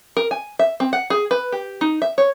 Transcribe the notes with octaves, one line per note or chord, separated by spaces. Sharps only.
A#4
G#5
E5
C4
F#5
G#4
B4
G4
D#4
E5
C#5